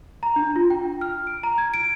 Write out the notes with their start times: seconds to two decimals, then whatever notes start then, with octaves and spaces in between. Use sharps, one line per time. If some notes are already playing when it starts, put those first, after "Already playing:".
0.23 A#5
0.36 D4
0.56 F4
0.70 G5
1.01 F6
1.27 D7
1.43 A#5
1.58 G#6
1.74 D7